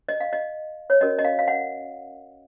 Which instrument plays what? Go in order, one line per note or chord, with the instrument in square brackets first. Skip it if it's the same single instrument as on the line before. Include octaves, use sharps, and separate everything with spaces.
[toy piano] D#5
F5
D#5
C#5
C#4 F#4 A#4 C#5 D#5
D#5
F5
F5
F#5